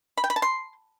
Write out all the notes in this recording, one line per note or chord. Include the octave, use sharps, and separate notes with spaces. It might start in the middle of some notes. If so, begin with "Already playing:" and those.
B5
G5
B5
A5
C6